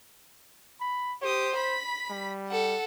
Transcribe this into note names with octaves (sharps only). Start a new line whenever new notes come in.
B5
G4 C5 D#6
B5 B6
G3
A4 F#5